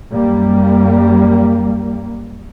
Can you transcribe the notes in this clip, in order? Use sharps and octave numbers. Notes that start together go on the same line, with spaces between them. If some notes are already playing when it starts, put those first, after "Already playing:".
F#2 G3 A#3